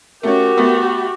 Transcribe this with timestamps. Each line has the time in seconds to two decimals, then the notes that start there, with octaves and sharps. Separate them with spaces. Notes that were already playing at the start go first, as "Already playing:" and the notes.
0.23 A3 C#4 F#4 G4 A#4
0.57 A3 B3